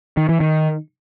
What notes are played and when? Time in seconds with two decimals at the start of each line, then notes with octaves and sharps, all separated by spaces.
0.17 D#3
0.29 E3
0.40 D#3